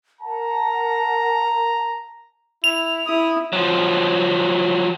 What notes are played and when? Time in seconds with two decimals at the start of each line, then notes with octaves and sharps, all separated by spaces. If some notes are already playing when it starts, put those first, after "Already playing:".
0.21 A#4 F#5 A5 A#5
2.64 E4 F7
3.06 E4 D#6
3.53 F3 F#3